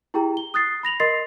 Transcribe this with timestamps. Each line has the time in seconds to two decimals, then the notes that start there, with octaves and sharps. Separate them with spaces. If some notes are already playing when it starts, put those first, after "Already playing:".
0.14 E4 G4 G#4 G5 A#5
0.37 G7
0.54 D#6 F#6 A6 C7
0.83 B5 A#6 F7 F#7
1.00 A#4 D#5 C6 A6 C7